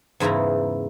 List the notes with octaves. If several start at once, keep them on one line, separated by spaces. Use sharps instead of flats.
E2 G#2 C#3 E4 A#5